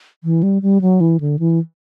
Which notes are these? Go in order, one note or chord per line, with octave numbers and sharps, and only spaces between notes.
E3
G3
G3
F#3
E3
D3
E3